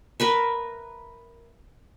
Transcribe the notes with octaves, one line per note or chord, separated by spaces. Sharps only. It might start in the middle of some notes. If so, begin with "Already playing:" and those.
A#4 B4 E5